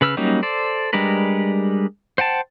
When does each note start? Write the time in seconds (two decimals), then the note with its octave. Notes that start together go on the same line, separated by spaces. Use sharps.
0.01 C#3 B4 E6 F6
0.17 F#3 G3 A#3 C#4 D#4
0.43 A4 C5 D5
0.93 G3 G#3 D4 A#4 B4
2.18 C5 F#5 G5 A5